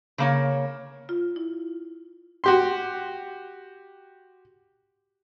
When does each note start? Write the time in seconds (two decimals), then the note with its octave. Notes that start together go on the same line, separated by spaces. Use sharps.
0.18 C#3 A#3 C#5
1.09 F4
1.36 E4
2.44 F#4 G4 C6